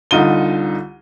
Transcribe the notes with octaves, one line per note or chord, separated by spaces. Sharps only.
C2 D3 D#4 F4 D#7 G7